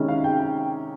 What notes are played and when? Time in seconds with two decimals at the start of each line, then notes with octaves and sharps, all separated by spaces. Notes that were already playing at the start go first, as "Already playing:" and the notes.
Already playing: C3 D#3 G#3 C#4 E4
0.08 F5
0.24 G5